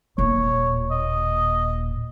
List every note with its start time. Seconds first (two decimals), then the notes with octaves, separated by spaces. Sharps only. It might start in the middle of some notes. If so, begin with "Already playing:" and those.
0.18 D#1 A#2 C#5
0.91 D#5